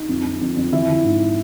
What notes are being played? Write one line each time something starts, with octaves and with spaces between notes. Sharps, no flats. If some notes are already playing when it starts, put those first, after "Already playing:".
Already playing: D#4
F2
F2
F2
F2
E3 E4
E3
G#2